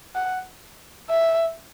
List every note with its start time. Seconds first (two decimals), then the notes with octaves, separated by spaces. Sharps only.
0.15 F#5
1.09 E5